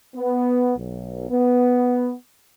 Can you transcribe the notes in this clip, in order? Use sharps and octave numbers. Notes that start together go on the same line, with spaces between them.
B3
B1
B3